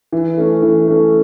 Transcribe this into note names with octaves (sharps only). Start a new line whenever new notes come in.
E3
A3 C#4
E3
A3 C#4